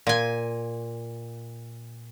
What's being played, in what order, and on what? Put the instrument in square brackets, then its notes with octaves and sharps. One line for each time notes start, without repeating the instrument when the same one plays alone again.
[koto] A#2 G#5